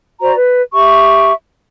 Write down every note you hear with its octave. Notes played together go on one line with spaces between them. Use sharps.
F#4 C5 D5 A#5
B4
G4 E5 C#6